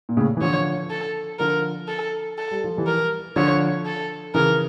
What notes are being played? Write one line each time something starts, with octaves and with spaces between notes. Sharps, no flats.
A#2
A2 C#3
E3
D3 F3 C#5
A4
D3 F3 A#4
A4
A4
G3
F3
E3 G3
A#4
D3 F3 C#5
A4
C#3 E3 A#4